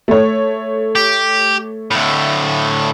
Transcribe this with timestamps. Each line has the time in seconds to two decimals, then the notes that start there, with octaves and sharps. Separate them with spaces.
0.08 A3 C#5
0.95 G4
1.91 D2 A2